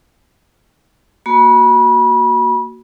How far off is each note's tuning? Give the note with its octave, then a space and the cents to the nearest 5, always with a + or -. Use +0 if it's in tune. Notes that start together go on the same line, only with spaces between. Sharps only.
A#3 +0 F#4 +0 B5 -30